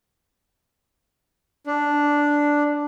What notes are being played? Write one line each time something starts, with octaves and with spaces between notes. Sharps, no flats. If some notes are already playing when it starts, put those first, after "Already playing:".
D4